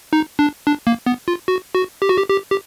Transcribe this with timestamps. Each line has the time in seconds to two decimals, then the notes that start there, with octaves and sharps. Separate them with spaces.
0.13 D#4
0.39 D4
0.67 D4
0.87 A#3
1.06 B3
1.28 F4
1.48 F#4
1.75 F#4
2.02 G4
2.09 F#4
2.17 G4
2.29 G4
2.51 G4